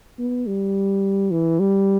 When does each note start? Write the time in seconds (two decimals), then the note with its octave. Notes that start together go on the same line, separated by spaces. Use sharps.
0.19 B3
0.47 G3
1.31 E3
1.60 G3